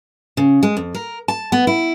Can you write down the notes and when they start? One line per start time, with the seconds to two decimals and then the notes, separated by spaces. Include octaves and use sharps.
0.37 C#3
0.63 G#3
0.77 F2
0.95 A#4
1.28 A5
1.52 B3
1.67 E4